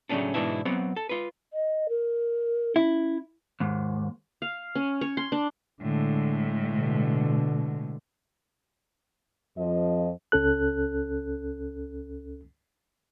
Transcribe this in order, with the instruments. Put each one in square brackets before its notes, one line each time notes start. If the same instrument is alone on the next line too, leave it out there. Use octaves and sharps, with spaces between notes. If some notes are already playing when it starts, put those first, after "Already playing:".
[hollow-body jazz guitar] A2 C#3 F#3 A3 C#4 D4
G#2 B2 E3 D4 E4
F#3 B3 C4 F#5
A4
F4 B4
[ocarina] D#5
A#4
[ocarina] C#4 [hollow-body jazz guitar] E4
[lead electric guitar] D#2 G#2
[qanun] F5
C#4
C#5
C6
D4
[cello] A2 G#3 [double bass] D3
[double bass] B2 D3
[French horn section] F2 F3 D#5
[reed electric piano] C#2 C#4 A4 F#6